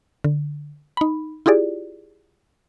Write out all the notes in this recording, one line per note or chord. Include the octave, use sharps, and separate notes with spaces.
D3
D#4 B5
E4 F4 G4 G#4 D5